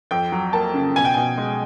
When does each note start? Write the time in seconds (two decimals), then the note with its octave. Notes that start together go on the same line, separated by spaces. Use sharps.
0.11 F2 G5
0.32 F#3
0.53 A#3 A5
0.74 C#3
0.96 B2 G#5
1.05 G5
1.14 B2 G#5
1.38 G#3